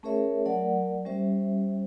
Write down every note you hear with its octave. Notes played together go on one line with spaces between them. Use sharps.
A3 C#4 G#4 A#4 C#5 E5
F#3 A3 A#4 D5 F#5
G3 C#4 G4 C5 E5